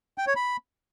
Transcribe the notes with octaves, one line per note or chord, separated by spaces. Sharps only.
G5
C#5
B5